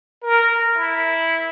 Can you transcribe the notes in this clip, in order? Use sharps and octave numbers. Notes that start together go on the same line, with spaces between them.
A#4
E4